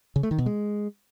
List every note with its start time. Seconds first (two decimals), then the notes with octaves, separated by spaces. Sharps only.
0.16 C#3
0.23 A3
0.31 D#3
0.39 B2
0.46 G#3